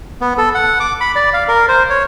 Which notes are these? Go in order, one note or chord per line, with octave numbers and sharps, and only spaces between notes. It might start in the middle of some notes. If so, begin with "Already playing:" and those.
B3
A4
F#5
D6
B5
D5
F5
A#4
C5
C#5